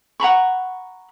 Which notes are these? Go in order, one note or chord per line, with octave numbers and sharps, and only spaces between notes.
F#5 A#5 B5 C#6